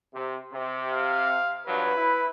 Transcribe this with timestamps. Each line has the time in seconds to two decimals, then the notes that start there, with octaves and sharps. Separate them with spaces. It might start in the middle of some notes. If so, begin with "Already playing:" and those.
0.14 C3
0.51 C3
0.91 F5
1.66 G2 F3 F#3 B4
1.96 E4